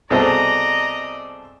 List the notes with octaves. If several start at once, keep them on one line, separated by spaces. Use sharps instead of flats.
C2 B2 G#4 A4 C5 D5 D#5 A#5